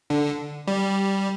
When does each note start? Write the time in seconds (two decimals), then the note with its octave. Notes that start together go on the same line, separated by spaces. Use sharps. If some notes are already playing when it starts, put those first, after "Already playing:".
0.10 D3
0.67 G3